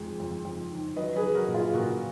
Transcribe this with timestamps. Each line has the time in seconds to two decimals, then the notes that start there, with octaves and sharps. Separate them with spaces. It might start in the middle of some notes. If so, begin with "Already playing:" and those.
Already playing: F2 D#3 G#3
0.20 F2
0.45 F2
0.71 D#3
0.96 F#3 B4 D#5
1.16 G#4 B4
1.22 F#3
1.35 F#4 A#4
1.48 A#2
1.54 F4 G#4
1.74 A#2 F#4 A#4